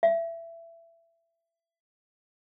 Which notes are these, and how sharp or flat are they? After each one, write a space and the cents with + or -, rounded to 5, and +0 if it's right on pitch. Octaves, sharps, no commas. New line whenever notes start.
E5 +20